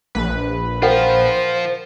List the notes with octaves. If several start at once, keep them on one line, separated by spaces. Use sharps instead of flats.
A#1 B4
F3 F4 A#4 C5 F#5 G5